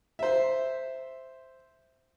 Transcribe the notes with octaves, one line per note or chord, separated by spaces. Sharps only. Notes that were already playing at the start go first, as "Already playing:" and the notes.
C5 E5